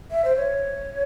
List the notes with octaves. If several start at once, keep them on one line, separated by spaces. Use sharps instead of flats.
E5
C5
C#5